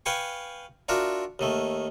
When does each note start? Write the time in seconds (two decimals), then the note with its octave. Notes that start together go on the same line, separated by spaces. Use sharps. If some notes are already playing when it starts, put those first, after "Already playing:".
0.06 B4 F5 G5 G#5 C#6
0.89 D4 F4 F#4 A#4 E5
1.39 D#2 D#3 A3